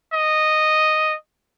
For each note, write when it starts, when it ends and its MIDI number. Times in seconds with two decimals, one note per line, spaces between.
0.13 1.16 75